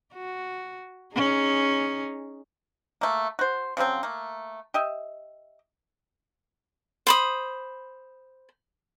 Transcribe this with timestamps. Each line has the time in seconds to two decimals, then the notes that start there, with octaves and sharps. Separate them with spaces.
0.14 F#4
1.14 C#4 D#4 G#4
3.01 A3 A#3
3.39 F#4 C5
3.77 C#3 F3 F#3 C4
4.03 A3 A#3
4.74 G4 D#5 E5
7.07 C5 B5 D#6